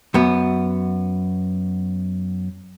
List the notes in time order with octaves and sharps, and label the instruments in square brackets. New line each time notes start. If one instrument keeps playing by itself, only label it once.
[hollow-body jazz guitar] F#2 B3